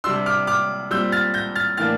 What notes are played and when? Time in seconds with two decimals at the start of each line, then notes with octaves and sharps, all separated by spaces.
0.04 C3 G3 D4 C6 E6
0.26 D6 F6
0.47 D6 F6
0.91 A#2 G3 C4 E6 G6
1.12 F6 A6
1.34 G6 A#6
1.56 F6 A6
1.77 A2 E3 A#3 D4 F6 A6